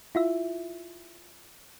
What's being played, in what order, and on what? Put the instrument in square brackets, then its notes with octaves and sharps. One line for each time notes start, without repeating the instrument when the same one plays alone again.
[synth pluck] E4 F4 E5